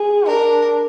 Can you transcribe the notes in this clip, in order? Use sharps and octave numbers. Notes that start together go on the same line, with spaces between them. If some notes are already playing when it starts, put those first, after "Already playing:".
Already playing: G#4
D4 A#4